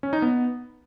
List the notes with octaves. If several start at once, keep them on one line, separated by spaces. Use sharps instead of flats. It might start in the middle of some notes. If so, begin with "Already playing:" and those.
C#4
D#4
B3